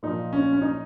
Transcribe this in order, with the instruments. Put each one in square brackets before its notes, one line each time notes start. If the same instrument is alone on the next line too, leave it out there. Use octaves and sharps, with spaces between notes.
[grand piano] A#2 F3 D#4
C#4
C#4
D#4